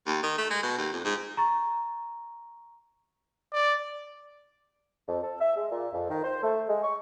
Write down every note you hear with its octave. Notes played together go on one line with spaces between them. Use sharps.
D#2
D#3
A3
G#3
B2
D#2
F2
G#2
A#5 C#6 A6
D5
F2
A4
E5
G#3
A#2
F2
D#3
C5
A3
G#3
C#6